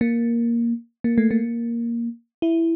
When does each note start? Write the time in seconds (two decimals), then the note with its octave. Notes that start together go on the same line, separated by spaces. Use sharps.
0.01 A#3
1.04 A#3
1.18 A3
1.31 A#3
2.42 E4